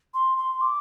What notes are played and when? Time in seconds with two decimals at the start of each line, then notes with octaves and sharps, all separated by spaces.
0.14 C6
0.38 C6
0.61 D6